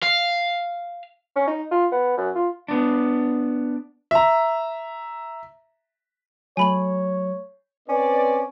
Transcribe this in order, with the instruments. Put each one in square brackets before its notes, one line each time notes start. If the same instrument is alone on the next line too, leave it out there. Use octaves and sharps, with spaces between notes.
[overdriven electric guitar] F5
[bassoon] C#4
D#4
F4
B3
F#2
F4
[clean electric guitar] B3 D4
[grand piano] E5 A#5
[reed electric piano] F#3 A3 [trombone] C#5 [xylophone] G#5 B5 F#7
[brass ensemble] C4 B4 D5 [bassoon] C#4